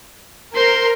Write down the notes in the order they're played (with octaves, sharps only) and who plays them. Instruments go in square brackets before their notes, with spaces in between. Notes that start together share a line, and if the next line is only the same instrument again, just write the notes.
[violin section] A#4 [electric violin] C5 C6